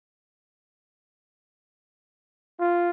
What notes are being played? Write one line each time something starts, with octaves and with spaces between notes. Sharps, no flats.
F4